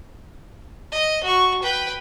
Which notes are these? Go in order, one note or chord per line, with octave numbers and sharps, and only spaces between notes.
D#5
F#4 C#6
B4 G5